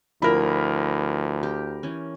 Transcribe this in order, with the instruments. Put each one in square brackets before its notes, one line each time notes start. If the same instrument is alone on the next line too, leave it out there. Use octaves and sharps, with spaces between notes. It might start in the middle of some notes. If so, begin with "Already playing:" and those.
[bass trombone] D2 [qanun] F3 E4 E5 [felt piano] A#4 B5
[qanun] G4
E3 C#4